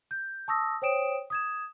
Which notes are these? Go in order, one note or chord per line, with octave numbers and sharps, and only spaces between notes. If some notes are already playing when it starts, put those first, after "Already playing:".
G6
A5 C#6 D#6 E6 A#6
C5 C#5 G5 D#6 D7 E7
D#6 G#6 E7